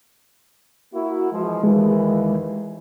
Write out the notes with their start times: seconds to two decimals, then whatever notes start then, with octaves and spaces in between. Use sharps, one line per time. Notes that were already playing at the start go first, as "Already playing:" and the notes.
0.93 A#3 E4 F#4
1.32 E3 F3 G#3
1.63 D#2 E3 G#3